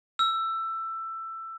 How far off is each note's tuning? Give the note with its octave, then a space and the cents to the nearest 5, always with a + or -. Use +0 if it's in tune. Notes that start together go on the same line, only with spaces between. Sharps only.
E6 +15